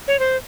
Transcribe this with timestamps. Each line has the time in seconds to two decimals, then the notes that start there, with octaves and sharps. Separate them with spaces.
0.08 C#5
0.19 C5